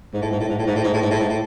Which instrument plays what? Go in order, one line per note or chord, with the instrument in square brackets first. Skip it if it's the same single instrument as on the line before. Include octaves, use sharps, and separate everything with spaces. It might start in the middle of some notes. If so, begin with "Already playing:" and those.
[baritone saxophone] G#2
A2
G#2
A2
G#2
A2
G#2
A2
G#2
A2
G#2
A2
G#2
A2